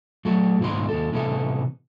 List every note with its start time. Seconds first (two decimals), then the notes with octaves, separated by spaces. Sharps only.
0.25 F#3 A3 F#4 A4
0.60 C#2 G#2 D#3 B3 F#4 C6
0.89 D#2 A4
1.12 A2 C3 E3 A3 B3 A4